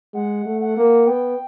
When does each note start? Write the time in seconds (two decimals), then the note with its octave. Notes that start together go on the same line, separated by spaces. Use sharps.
0.14 G#3 F#5
0.46 A3
0.61 F#5
0.77 A#3
1.07 B3 G5